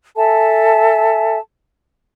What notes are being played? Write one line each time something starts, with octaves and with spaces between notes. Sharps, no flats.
A4 E5 G#5 A5